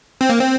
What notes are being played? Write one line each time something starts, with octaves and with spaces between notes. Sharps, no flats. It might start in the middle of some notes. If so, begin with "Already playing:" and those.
C4
A#3
C4